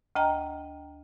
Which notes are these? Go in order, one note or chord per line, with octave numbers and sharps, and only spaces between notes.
D2 D#5 G5 A#5